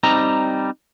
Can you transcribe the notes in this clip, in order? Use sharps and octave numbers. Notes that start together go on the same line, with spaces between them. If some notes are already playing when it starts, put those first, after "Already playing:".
G3 C4 D#4 A#5